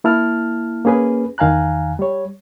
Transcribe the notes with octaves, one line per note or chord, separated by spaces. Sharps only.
A#3 E4 A5 F6
A#3 C#4 G#4 B4
E2 D#3 F5 G#5 A#5 F#6
G3 C#5